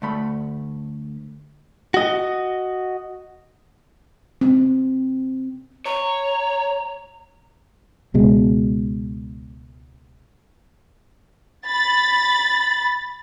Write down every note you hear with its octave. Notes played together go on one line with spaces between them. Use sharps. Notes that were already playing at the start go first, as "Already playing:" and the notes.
D2 A3 B5
F#4 D#5
C4
C#5 A#5
C#2 B2 G#3
B5 A6